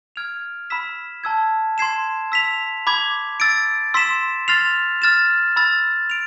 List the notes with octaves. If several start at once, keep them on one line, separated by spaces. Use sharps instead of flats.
F6 G#6 D7 F7
B5 E6 B6 E7
A5 E6 G#6
C6 G#6 C7 E7
E6 B6 F7
B5 D6 G#6
E6 A6 D7
C6 E6 B6 E7
C6 F6 A6 C7 F7
F6 A6 E7
B5 E6 A6
D7 F7